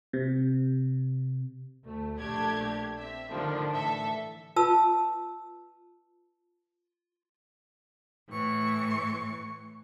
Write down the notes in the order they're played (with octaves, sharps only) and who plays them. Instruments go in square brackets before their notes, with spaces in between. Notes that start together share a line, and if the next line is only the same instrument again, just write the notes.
[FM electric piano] C3
[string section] D2 A3
A#1 A3 D4 G4 G#6
C4 E5
D3 D#3 F3 G3 D4
A2 E3 A4 E5
[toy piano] F4 B4 A5 E6
[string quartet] A2 E3 C#6